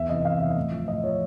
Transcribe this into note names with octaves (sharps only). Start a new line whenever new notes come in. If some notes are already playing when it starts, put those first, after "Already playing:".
Already playing: E2 E5
C3 E3 D#5
E2 F5
C3 E3 E5
A2
F3
A2 D#5
F3 C#5